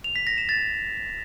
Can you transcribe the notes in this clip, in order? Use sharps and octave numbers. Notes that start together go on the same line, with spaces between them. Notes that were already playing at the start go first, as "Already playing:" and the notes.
F7
B6
A#6
E7
A6